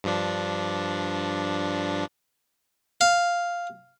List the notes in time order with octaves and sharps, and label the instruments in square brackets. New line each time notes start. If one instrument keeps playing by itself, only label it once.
[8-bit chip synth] G2 F3 D4
[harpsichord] F5